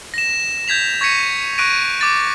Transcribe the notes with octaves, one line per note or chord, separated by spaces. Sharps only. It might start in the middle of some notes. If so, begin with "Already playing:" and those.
A#6 E7
G6 G#6 B6 F7
C#6 G#6 A#6 B6 C#7 D#7
C#6 F#6 A#6 D7 D#7
D6 A6